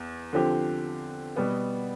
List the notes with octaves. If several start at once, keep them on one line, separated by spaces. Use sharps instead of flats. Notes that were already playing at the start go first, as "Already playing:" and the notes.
Already playing: E2
D3 F3 C4 G4
B2 G3 B3